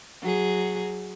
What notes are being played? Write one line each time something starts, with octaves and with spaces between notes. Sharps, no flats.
F#3 G#4